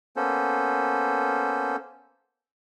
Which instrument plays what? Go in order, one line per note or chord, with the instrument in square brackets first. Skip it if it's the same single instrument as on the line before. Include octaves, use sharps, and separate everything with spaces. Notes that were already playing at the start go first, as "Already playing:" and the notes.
[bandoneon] A#3 B3 C#4 A4 C5